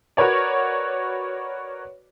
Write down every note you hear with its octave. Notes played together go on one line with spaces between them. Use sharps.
F#4 A#4 B4 C#5 D5